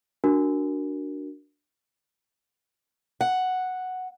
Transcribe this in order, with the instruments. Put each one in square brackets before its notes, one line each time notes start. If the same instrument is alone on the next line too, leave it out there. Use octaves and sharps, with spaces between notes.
[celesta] D4 F#4 A#4
[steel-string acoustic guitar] F#5